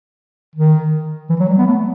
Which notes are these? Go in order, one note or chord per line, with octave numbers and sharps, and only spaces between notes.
D#3
E3
F#3
G3
B3
A3